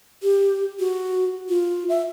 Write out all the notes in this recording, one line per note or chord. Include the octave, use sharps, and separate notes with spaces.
G4
F#4
F4
E5